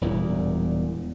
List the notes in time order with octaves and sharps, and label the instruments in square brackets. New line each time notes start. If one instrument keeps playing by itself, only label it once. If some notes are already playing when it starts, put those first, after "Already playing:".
[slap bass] E1 E2 A#2 G3